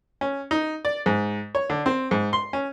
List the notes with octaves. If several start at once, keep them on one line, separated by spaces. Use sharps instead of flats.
C#4
D#4
D5
G#2
C#5
D3
C4
G#2
C6
C#4